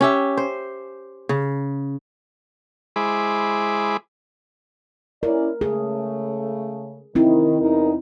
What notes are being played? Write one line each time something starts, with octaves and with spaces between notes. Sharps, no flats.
C#4 G4 E5
C5
C#3
G#3 E4 G#4 C5 B5 D6
C#4 E4 A#4 D5
C#3 A3 G#4
D#3 C4 E4
E2 D#4 A#4